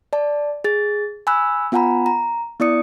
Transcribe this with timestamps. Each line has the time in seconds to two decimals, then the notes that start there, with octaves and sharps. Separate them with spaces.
0.13 D5 A5
0.64 G#4 A6
1.27 G#5 B5 E6 F#6
1.72 B3 F4 F#5 G#5 A#5 B5
2.06 A#5
2.60 B3 E4 D5 D#6 C#7